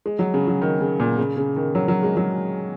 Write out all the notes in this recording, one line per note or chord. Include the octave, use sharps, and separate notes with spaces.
G#3
F#3
C#3
F#3
D#3
C#3
A#2
C#3
C#3
D#3
F#3
F#3
G#3
F#3